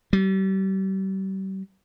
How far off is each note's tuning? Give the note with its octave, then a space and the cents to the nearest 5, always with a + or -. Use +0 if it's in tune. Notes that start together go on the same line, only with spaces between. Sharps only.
G3 -35